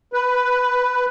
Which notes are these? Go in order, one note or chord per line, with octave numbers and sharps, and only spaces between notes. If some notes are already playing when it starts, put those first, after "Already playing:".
B4